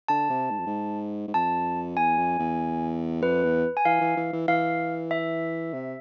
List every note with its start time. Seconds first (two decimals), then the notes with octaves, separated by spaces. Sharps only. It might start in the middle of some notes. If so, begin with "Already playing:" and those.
0.08 D3 A5
0.30 C3
0.50 G#2
0.59 F2
0.67 G#2
1.28 G#2
1.34 F2 A5
1.97 E2 G#5
2.17 F2
2.39 E2
3.22 F2 B4
3.43 E2
3.77 G#5
3.85 E3 F5
4.01 E3
4.17 E3
4.33 E3
4.48 E3 F5
5.11 E5
5.74 C3